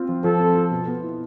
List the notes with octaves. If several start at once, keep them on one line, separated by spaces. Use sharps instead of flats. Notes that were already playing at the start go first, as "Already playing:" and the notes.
Already playing: C4 F4
F3
F3 A4
C4
F4
B2
B3
E4